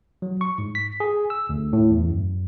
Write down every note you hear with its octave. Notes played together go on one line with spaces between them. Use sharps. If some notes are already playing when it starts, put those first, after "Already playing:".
F#3
C#6
G#2
B6
G#4
E6
D2
A2
E2
F#2